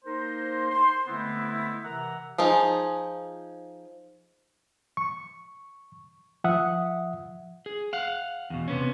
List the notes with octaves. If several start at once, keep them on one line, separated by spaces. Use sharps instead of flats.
A#3 D#4 A#4 C5
C5 C6
D3 G#3 A3 B3 C4 E4
C3 E3 A#4 E5 F#5 A#5
F3 D#4 G#4
C#6
F3 E5 F#5 D#6
G#4
F5 F#5
E2 B2
C3 B3 C#4